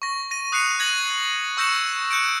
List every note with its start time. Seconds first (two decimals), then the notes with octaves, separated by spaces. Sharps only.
0.02 C#6 A#6
0.31 A#6 D#7
0.52 D#6 F#6 C7 C#7 D#7 F7
0.80 G#6 A#6 F#7
1.57 C#6 E6 G6 A#6 C#7 E7
2.10 F#6 G6 C#7 D7